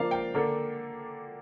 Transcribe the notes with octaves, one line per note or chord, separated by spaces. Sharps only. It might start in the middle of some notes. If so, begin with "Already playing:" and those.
Already playing: F3 A#3 D4 F5
G5
D3 A#3 D4